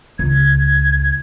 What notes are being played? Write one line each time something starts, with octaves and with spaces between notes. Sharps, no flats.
C#2 G#6